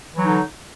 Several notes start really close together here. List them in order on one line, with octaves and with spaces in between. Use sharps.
E3 F#3 D#4 D3